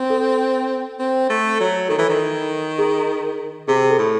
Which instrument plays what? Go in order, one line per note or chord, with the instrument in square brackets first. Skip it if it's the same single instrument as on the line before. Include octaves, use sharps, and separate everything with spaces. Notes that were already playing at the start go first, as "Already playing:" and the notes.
Already playing: [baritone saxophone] C4
[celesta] A4
[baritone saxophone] C4
A3
F#3
[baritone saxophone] D#3 [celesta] A4
[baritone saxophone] E3
D#3
[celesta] G#4
[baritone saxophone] C3 [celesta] G#4
[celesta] G#4
A4
[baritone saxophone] A2